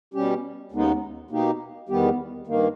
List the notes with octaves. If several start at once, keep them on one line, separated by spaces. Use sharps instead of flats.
B2 G3 C#4 G4
D#2 C#3 G#3 B3 D#4
B2 A#3 D#4 G4
E2 D#3 G3 B3 G4
G2 D#3 A#3